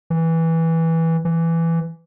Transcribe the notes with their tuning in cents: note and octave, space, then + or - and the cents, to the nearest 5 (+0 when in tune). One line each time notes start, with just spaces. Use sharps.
E3 -10
E3 +10